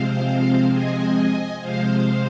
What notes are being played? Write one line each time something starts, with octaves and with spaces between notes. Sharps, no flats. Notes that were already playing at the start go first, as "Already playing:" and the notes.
Already playing: C3 F3 G#3 C4 C5 F5
D#5 G#5
C3 F3 G#3 C5 F5